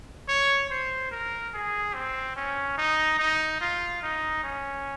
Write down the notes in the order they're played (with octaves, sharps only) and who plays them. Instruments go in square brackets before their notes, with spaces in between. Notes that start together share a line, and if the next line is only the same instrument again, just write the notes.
[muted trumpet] C#5
C5
A#4
G#4
C4
C#4
D#4
D#4
F4
D#4
C#4